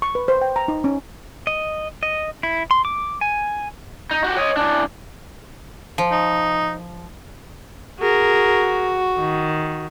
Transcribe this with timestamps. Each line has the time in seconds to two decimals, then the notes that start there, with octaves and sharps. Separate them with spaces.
0.02 C#6
0.15 B4
0.28 C5
0.42 G5
0.56 A#5
0.68 D#4
0.84 C#4
1.47 D#5
2.03 D#5
2.43 E4
2.71 C6
2.85 D6
3.21 G#5
4.11 D#4
4.24 F#4 G4
4.37 C#5 D#5
4.57 E3 D4
5.98 F3
6.12 D#4
8.00 F#4 G#4 A#4
9.19 D#3